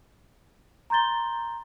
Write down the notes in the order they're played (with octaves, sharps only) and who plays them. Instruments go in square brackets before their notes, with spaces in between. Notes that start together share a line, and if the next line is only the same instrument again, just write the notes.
[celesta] A#5 C6 G6 A6 G7